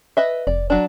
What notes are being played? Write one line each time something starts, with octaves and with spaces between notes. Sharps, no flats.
B4 D#5 E5
F1 D5
F#3 D4